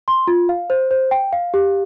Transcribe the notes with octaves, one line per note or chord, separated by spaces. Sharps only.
C6
F4
F5
C5
C5
G5
F5
G4